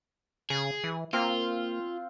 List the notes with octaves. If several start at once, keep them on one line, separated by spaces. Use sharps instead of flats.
C#3 G#4
E3
A#3 C4 F4 F5